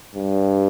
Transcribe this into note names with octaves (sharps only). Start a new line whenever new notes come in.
G2